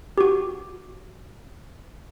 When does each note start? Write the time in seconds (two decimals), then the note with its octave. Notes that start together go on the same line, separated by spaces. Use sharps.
0.18 F#4 G4